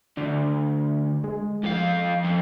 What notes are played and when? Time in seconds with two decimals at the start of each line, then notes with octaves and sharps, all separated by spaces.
0.17 D2 D4
1.24 G#3
1.63 F2 F3 F5
2.24 F2